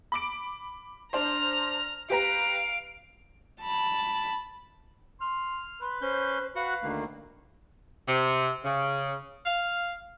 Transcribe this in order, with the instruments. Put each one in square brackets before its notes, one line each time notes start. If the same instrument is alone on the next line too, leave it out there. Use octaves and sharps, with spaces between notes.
[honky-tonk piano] B5 D6 D7
[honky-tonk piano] D4 C5 [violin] A#5 F6
[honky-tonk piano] G4 B4 A#5 [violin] F5 D7
[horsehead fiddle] A5 B5
[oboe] C6 [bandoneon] F6
[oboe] B4 [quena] C6
[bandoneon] C#4 G6 [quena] C5
[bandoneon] F#4 F#5 [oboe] B4 [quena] F5
[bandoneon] D2 D#3 A#3
[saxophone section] C3
C#3
F5